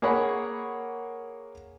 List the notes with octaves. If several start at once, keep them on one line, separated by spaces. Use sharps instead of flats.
A#3 G#4 C#5 F#5 B5 C#6